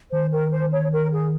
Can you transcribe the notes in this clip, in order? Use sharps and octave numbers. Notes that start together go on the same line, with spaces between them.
D#3 C5
A#4
C5
C#5
A#4
G#4